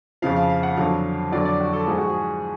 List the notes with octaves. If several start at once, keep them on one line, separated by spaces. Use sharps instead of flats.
F2 C#3 F3 F5
F5
F5
F#5
F2 D3 F#3 F5
F2 D3 F#3 D5
D5
F#4
A4
G#2 F3 G#4
F#4
G#4